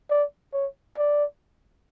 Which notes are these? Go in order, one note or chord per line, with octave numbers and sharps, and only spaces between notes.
D5
C#5
D5